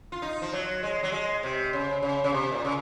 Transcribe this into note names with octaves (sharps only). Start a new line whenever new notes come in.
F4
D#4
F3
F#3
G#3
F#3
G#3
C3
C#3
C#3
C#3
C3
A#2
C#3